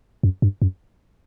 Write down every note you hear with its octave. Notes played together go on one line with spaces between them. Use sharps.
F#2
G2
F#2